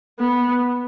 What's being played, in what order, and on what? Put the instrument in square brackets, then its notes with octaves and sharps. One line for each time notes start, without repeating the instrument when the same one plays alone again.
[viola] B3